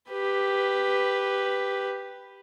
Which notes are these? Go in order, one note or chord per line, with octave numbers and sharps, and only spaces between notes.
G4 B4